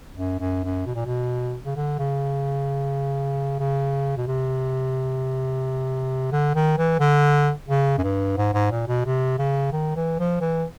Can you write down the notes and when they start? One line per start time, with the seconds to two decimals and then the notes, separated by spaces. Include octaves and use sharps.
0.17 F#2
0.40 F#2
0.64 F#2
0.86 B2
0.95 A#2
1.06 B2
1.66 C#3
1.76 D3
1.99 C#3
3.60 C#3
4.17 B2
4.27 C3
6.32 D3
6.55 D#3
6.78 E3
7.00 D3
7.68 C#3
7.98 F#2
8.03 G2
8.37 G#2
8.54 G#2
8.71 A#2
8.88 B2
9.05 C3
9.39 C#3
9.73 D#3
9.97 E3
10.19 F3
10.41 E3